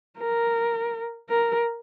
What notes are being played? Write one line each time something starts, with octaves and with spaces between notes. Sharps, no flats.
A#4
A#4